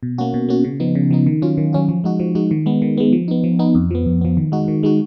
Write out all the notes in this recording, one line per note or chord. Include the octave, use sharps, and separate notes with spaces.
B2
A#3 C#4 F#4
B2
A#3 C#4 F#4
C#3
F3 B3 D#4
C#3
F3 B3 D#4
D#3
F#3 C#4 F4
D#3
F#3 C#4 F4
F3
G#3 D#4 F#4
F3
G#3 D#4 F#4
D#3
G#3 B3
D#3
G#3 B3
F3
B3 D#4
F3
B3 D#4
F2
F3 B3
F2
F3 B3
D#3
G#3 D#4 F#4
D#3
G#3 D#4 F#4